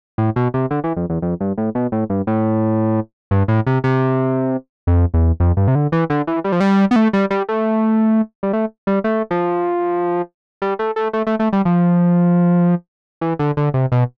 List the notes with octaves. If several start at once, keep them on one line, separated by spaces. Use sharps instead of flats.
A2
B2
C3
D3
E3
F2
E2
F2
G2
A2
B2
A2
G2
A2
G2
A2
C3
C3
F2
E2
F2
G2
C3
D3
E3
D3
E3
G3
F3
G3
B3
A3
G3
G3
A3
G3
A3
G3
A3
F3
G3
A3
A3
A3
A3
A3
G3
F3
E3
D3
D3
C3
B2